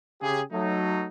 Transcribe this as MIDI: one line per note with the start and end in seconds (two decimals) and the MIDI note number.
0.21 0.40 49
0.21 0.40 67
0.21 0.40 68
0.52 1.06 54
0.52 1.06 57
0.52 1.06 63